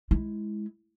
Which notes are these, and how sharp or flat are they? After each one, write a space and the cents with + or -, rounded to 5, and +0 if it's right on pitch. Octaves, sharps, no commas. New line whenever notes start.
G#3 +10 E4 +0